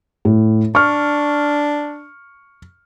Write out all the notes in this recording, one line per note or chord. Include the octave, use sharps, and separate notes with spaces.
A2
D4 C#6 F6